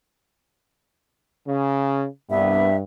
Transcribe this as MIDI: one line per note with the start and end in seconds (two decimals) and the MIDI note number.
1.48 2.06 49
2.30 2.68 36
2.30 2.81 43
2.30 2.68 59
2.30 2.76 76